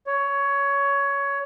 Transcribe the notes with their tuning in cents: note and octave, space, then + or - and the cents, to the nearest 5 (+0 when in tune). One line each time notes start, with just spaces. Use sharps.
C#5 +15